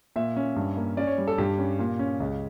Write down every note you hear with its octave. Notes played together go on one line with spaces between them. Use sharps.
A#2 E5
C#4
G2
A#3
C#4 D5
C#5
G3
A4
G2 G4
C#4
A#2
C#4
C#2